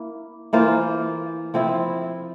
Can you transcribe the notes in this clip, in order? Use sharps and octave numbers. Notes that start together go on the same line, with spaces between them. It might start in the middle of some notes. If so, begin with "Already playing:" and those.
Already playing: A#3 E4
E3 A#3 F4 C5
F3 C4 E4